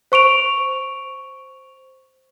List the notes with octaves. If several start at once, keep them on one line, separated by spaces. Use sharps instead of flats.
C5 C#6 D7 F7